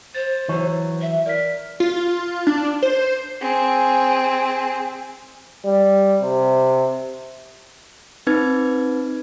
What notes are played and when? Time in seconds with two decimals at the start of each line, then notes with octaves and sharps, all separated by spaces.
0.15 C5 A6
0.49 E3 F#3 C#5 C#6
1.01 E5
1.26 A#4 D5 B6
1.80 F4
2.47 D4
2.83 C5
3.41 C4 G#4
5.65 G3
6.22 C3
8.27 C4 D#4 B4 G#6